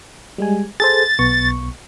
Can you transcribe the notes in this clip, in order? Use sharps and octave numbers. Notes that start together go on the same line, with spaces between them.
G3 G#3 G#5
G#4 A4 C5 A6
B1 B3 C#6